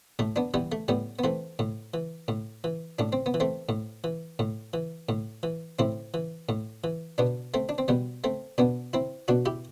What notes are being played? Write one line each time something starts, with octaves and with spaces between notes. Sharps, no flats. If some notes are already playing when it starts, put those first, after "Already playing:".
A2 A3
B3 D4
E3 G3 B3
A3
A2 G3 B3
B3
E3 A3 C4
A2
E3
A2
E3
A2 D4
C4
B3
E3
A3 C4
A2
E3
A2
E3
A2
E3
A2 C4 E4
E3
A2
E3
B2 B3 D4
A3 C4
D4
C4
B2 G3 B3
A3 C4
B2 B3 D4
C4 E4
B2 D4 F#4
E4 G4